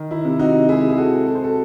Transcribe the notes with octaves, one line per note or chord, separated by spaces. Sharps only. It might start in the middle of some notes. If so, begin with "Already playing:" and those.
Already playing: D#3
E4
C3
D#4 F#4
G#3 E4 G#4
G#4
F#4 A4
C4
A4
C5
F#4 A4